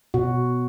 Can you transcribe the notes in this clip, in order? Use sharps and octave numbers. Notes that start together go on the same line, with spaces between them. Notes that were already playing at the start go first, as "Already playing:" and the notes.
B2 F#4